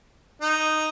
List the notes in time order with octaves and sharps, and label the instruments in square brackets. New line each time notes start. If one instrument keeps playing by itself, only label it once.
[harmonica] D#4